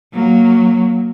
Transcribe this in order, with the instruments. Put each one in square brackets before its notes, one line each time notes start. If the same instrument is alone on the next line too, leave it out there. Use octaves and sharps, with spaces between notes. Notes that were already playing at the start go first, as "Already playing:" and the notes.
[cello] F#3 A#3